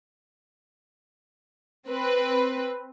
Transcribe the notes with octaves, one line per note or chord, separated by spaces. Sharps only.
C4 B4